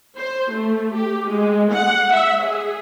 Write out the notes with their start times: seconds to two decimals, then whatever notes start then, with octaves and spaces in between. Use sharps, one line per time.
0.16 C5
0.52 A3
0.95 G4
1.29 G#3
1.72 F#5
2.13 E5
2.43 G#4